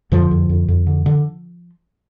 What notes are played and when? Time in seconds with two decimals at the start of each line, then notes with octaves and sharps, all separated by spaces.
0.12 F2 D3 F3
0.31 F2
0.49 F2
0.68 F2
0.87 D3
1.06 D3